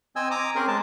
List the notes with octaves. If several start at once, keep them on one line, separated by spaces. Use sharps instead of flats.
C4 D#5 G#5 E6
A#5 D6 D#6
C4 C#4 G#4 A#4
G#3 A5